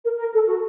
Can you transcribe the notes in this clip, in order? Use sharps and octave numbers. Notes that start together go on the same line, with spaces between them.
A#4
A#4
A4
F#4